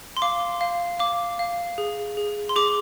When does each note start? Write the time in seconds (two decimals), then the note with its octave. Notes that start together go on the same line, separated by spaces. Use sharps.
0.17 C6
0.22 F5 D6
0.61 F5
0.99 F5 D6
1.39 F5
1.78 G#4
2.17 G#4
2.49 C6
2.56 G#4 D6